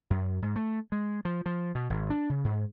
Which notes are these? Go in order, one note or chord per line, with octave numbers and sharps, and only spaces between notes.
F#2
G#2
A3
G#3
F3
F3
B2
G#1
D4
C#3
G#2